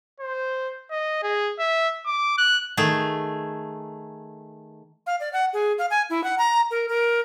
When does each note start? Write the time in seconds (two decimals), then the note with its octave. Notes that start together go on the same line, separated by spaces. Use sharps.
0.20 C5
0.91 D#5
1.23 G#4
1.60 E5
2.06 D6
2.38 F#6
2.77 D#3 A3 G#4
5.06 F5
5.20 D5
5.33 F#5
5.53 G#4
5.78 F5
5.90 G#5
6.10 E4
6.24 F#5
6.38 A#5
6.71 A#4
6.89 A#4